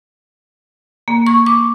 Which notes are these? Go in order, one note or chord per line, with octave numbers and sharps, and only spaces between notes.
A#3
C#6
D6